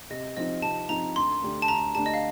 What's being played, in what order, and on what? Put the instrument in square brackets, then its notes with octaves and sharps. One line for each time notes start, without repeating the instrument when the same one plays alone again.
[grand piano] C3 [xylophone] D#5
[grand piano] F3 C4 D#4 [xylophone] D#5
[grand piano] C3 [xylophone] A5
[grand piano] F3 C4 D#4 [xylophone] A#5
[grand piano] D2 [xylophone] C6
[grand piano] D3 A3 D4 G4
[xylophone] A5
[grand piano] D2 [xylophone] A#5
[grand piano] D3 A3 D4 G4 [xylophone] A5
[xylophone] D#5
F5